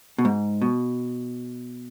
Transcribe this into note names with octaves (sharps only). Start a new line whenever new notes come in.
B2
G#2
B2